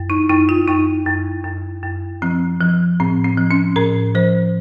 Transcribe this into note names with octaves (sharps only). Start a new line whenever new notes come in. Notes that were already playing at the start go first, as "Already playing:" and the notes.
Already playing: F#2
D#4
F#2 D#4
F4
F#2 D#4
F#2
F#2
F#2
F3 C4
F3
A2 C4
C4
F3
C#4
A2 A#4
F3 C5